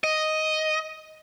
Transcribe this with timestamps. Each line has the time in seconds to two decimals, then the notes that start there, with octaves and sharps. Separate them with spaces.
0.04 D#5